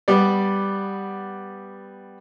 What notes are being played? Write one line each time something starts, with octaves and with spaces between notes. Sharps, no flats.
G3 B3 D5